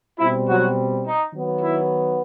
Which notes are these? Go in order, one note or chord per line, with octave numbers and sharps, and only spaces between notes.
B2 G3 C4 E4
F#3 F#4
D#4
D#3 F#3 B3
E4